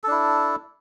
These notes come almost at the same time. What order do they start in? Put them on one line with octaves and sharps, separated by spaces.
A4 D4 E4